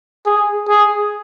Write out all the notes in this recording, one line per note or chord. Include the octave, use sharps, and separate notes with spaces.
G#4
G#4